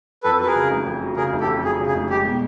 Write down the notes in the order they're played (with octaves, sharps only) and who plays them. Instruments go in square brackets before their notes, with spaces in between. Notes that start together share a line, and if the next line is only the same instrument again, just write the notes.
[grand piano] F2 [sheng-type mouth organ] A4 B4
[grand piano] F#3 [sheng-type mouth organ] B4
[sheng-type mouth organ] G#4 A#4
[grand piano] C#3
F1
F2
F#3
[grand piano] C#3 [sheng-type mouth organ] G#4 A#4
[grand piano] F1
[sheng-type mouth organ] G4 A4
[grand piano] F2
[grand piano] F#3 [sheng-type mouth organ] G#4
[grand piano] C#3
[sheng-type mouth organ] G#4
[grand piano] F1
[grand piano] G#3 [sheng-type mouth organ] G4
[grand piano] B2